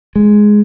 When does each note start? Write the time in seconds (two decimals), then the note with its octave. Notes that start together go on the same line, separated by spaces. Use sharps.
0.16 G#3